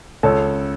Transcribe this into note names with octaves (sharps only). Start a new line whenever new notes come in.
C#2 A4 C#5